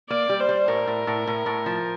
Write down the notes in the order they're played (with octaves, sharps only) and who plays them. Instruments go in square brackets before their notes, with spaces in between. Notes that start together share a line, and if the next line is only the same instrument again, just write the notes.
[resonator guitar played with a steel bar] A#3 [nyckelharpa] D5
[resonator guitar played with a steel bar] G3
[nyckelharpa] C5
[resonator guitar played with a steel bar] G3
[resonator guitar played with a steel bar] A2 [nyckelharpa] A#4
[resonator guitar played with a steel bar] A2
A2
A2
A2
F3